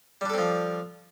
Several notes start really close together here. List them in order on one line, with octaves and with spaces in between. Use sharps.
G3 D4 A4 C4 F3